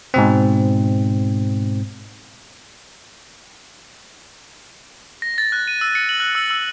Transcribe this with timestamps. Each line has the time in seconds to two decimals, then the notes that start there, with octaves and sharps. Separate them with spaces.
0.14 G#2 B2 C4
5.22 A#6
5.38 A6
5.52 F#6
5.68 D#7
5.81 E6
5.95 C#7
6.09 F#7
6.20 F#6
6.35 E6
6.51 E6